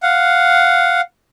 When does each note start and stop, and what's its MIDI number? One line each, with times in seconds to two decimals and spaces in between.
0.03 1.01 77
0.03 1.01 78